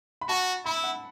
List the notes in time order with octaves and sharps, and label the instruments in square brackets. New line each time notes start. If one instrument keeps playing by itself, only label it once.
[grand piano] B5
[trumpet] F#4 [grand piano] A5
[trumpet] E4 [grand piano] B5
[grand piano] F#5